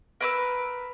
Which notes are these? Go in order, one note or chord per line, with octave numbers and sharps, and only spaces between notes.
A#4 B4 E6